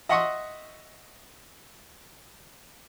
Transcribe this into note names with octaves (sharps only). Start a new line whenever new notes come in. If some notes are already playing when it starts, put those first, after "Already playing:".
D#5 E5 F#5 C6 C#6 D#6